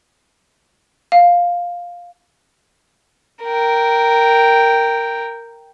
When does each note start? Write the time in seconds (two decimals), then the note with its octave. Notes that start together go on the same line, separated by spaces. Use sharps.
1.12 F5
3.44 A#4 G5